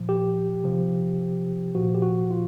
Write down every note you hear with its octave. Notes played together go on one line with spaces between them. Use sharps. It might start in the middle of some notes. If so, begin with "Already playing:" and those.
Already playing: A#2 F3
G4
C3 F3
A#2 F3 F#4
G4
F#4
F4